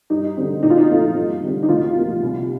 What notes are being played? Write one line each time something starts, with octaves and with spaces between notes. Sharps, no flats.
G2 D#4
D3 G3 C4
A#2 D#4
F4
D#4
F3 A3 C4
G2
D3 G3 C4
D#4
D2 F4
C3 F3 A#3
C2